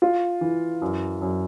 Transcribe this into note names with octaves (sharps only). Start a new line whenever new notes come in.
F4
E3
F#2
F#2